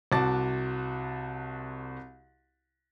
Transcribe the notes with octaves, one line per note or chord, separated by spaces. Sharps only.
C2 C3 F#4 A5 D6 A6